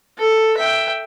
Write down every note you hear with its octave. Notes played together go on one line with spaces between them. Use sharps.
A4
E5 G5